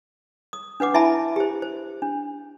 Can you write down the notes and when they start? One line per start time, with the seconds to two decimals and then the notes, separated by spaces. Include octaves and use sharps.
0.53 D#6
0.80 D4 B4 F#5 D6
0.94 E4 E5 G#5 A5 B5
1.36 G4 C5
1.62 C5
2.02 D4